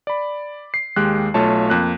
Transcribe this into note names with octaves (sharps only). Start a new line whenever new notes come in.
D5 B5
C7
D#2 G#3 G4 F#6
B1 A3 F4 C#5 A5
F2 A#3 F#6